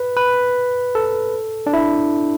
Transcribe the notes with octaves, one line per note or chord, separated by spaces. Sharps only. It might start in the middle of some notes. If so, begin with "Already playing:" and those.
Already playing: B4
B4
A4
D4
E4